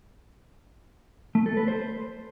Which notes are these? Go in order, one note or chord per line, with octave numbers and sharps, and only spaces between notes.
A3
A4
B4
C5